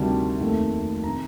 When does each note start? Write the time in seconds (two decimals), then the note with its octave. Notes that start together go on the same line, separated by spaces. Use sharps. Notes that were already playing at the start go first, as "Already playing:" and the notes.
Already playing: D2 C3 D#3 G3 A5
0.41 F1 D#2 D#3 A3
1.04 C3 D#3 A#5